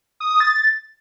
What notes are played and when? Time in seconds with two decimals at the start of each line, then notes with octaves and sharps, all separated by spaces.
0.20 D#6
0.30 D#6
0.40 A6